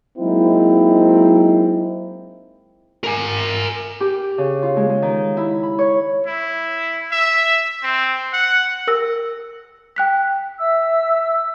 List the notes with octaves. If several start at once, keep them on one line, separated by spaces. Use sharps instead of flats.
F#3 G#3 A#3 C4 D#4 E4
A#4 G#5
G4
C#3
F4
G#3
G#3
D#3
E4
B5
C#5
E4
E5
C4
F#5
A#4 E6 A#6
G5 F#6 B6
E5 E6